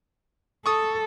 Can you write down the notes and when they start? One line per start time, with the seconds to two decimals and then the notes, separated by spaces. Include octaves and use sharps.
0.66 A4 C#6 D#6